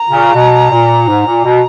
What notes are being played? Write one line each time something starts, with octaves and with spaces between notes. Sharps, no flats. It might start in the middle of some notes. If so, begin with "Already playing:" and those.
Already playing: A#5
A#2 C#3
B2
A#2
G#2
A#2
B2